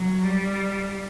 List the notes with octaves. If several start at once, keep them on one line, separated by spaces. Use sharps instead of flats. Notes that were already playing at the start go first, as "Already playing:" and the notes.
Already playing: F#3
G3